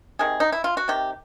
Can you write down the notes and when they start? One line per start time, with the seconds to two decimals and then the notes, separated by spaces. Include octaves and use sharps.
0.19 C3 D#3 G#4
0.40 D#4
0.52 E4
0.64 F4
0.77 F#4
0.88 C3 D#3 G4